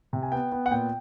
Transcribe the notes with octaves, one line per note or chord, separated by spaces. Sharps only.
C3
G#5
B3 G5
B3
F#5
A#2 G5